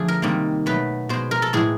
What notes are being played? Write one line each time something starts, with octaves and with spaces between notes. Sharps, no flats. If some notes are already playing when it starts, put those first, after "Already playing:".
Already playing: D3 F3 A3 G#4
A#4
C3 D#3 G3 A#3
B2 F#3 A3 B4
B2 G#3 C5
A#4
A4
A2 E3 G#3 G#4